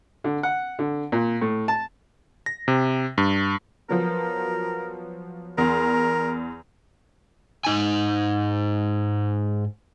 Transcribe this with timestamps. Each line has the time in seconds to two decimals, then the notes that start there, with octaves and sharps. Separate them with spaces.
0.24 D3
0.43 F#5
0.79 D3
1.12 A#2
1.41 A2
1.68 A5
2.46 A#6
2.68 C3
3.18 G2
3.89 F3 F#3 B3 A#4
5.58 E2 A#4 C6
7.65 G#2 D#4 G#5